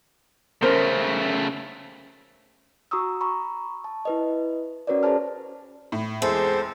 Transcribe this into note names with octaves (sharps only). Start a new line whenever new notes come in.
C#3 A3 C#4 A#4 C5
F#4 A#5 C#6 D#6 E6
A#5 B5 C#6
A5
E4 B4 D#5
C#4 F#4 A#4 B4 C#5 D5
F#4 G#4 A#4 C5 A5 F6
A2
E2 G#3 C4 E4 A4 C5